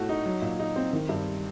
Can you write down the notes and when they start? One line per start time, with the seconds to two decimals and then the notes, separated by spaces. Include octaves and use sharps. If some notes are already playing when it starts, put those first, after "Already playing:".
Already playing: A2 A3 F#4
0.09 D#4
0.26 F#3
0.42 A#2
0.59 D#4
0.76 C4
0.93 D#3
1.09 G2